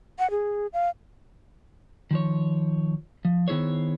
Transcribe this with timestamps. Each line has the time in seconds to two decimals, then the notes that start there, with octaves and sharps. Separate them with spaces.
0.19 F#5
0.31 G#4
0.73 F5
2.11 D#3 F3 C#5
3.25 F3
3.48 D#3 B3 E4 G#4 C5 C#5